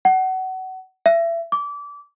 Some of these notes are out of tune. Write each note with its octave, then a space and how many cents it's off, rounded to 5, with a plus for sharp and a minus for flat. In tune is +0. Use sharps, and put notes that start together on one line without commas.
F#5 +25
E5 +30
D6 -25